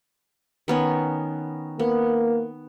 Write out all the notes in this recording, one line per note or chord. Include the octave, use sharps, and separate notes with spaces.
D#3 B3 C#4
A#3 B3